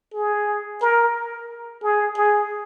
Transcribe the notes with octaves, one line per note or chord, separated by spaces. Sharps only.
G#4
A#4
G#4
G#4